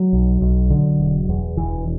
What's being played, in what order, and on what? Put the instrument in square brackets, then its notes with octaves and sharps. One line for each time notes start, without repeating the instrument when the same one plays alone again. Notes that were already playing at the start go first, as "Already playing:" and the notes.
Already playing: [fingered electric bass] F#3
B1
B1
D3
E1
E2
E1 E3